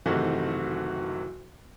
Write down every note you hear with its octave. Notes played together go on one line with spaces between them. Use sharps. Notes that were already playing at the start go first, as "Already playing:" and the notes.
F#1 C3 D#3 E3 A3 F#4